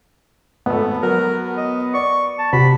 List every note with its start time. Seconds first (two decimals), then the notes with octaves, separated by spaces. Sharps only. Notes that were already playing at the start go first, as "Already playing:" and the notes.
0.66 G#1 A3 B3
1.03 F#3 A#4
1.57 D#5
1.94 D5 C#6
2.38 A5
2.53 C3 F#4 B5